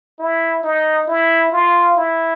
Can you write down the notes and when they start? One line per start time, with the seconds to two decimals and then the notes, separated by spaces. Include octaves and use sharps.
0.19 E4
0.63 D#4
1.07 E4
1.52 F4
1.97 E4